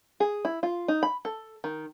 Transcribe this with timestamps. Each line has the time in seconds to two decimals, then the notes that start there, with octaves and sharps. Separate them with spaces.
0.20 G#4
0.45 E4
0.63 F4
0.88 D#4
1.03 B5
1.25 A4
1.64 D#3